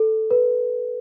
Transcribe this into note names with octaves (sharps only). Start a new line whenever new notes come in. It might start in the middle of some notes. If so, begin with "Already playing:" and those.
Already playing: A4
B4